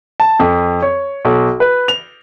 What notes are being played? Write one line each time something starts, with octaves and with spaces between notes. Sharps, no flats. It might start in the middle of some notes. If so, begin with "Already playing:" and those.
A5
F2
C#5
B1
B4
F7